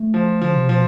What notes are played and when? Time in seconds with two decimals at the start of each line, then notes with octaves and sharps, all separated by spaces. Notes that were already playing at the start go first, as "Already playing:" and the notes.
Already playing: A3
0.14 F3
0.41 D3 F3
0.55 C3
0.68 B2 F3